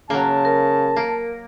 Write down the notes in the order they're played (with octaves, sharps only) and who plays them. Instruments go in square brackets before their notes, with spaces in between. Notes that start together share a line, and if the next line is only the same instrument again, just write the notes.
[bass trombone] C#3 [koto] F#3 A#3 [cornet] A5
[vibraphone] A#4
[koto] A#3